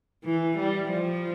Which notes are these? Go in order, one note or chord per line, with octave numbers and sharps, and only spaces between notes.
E3
G3
F3